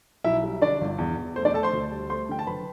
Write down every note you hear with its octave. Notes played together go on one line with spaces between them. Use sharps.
B1 E4 E5
G3
D3 D4 D5
G1
E2
E2
A3 C5
D4 D5
A3 A4 A5
C5 C6
D2
G3
A3 C5 C6
D3 G5
A5
F#1 B4 B5